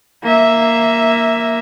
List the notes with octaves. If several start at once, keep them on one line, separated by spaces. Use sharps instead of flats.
A#3 E5